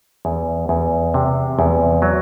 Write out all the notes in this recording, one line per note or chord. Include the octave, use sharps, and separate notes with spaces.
E2
E2
C3
E2
F#3